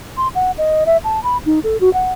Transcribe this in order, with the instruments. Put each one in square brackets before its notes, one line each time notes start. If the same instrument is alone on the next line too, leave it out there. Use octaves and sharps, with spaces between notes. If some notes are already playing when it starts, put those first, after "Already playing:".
[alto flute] C6
F#5
D#5
E5
A5
B5
D#4
A4
F#4
F#5